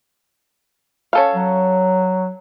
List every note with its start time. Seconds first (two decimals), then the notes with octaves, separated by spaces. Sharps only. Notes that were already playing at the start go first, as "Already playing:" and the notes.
1.13 C#4 A4 F5
1.35 F#3